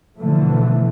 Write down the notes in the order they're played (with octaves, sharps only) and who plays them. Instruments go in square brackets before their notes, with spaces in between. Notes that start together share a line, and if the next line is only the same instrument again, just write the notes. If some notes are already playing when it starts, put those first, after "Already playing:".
[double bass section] B2 D3 E3 F3 A3